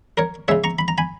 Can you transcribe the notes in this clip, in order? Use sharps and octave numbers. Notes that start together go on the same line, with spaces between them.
A#4 C#5
C#3 G#3 C#5 E5
A#5 C#6
B5
A#5
G#5 B5